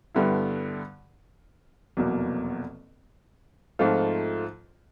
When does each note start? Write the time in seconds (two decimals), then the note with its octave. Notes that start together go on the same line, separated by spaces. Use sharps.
0.15 G2 D3 G3 B3 E4
1.97 F1 E2 B2 F#3 A#3
3.79 G#2 F3 A3 C4 F4